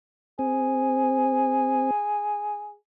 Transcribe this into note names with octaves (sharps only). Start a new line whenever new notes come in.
C4 G#4